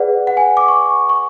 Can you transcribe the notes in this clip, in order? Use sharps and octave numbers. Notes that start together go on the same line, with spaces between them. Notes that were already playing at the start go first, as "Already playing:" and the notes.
Already playing: G#4 B4 D5 F#5
F#5
G#5
D6
C#6
C#6